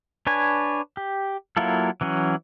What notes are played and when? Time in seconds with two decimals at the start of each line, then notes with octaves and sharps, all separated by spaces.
0.27 D4 B4 C#5 G#5
0.97 G4
1.57 F#3 A#3 E4 F4 A4
2.01 E3 F#3 C#4